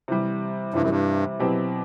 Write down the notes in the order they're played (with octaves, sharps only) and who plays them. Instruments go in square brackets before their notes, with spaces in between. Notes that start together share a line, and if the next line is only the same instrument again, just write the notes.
[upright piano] C3 E3 G3
[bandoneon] G2 [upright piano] C3 E3 G3
[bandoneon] F#2
G2
[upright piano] B2 F#3 C4 E4 G4